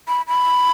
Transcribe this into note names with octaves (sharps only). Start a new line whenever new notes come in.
B5
B5